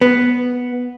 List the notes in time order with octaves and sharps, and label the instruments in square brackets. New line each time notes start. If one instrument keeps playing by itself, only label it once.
[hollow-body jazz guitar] B3